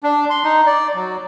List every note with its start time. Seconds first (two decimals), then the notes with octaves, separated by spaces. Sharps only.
0.03 D4
0.30 C6
0.44 D#4
0.66 D5
0.95 F#3